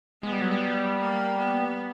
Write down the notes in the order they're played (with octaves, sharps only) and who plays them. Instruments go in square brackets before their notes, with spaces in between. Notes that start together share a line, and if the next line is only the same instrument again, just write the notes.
[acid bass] G#3 [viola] B3
[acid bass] G3
F#3
G3
[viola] A#3
B3